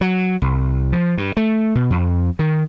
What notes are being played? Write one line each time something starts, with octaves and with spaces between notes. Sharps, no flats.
F#3
C2
F3
G2
A3
B2
F2
D#3